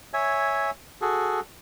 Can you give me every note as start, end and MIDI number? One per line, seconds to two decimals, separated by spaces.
0.14 0.70 73
0.14 0.70 76
0.14 0.70 80
1.02 1.40 66
1.02 1.40 68
1.02 1.40 69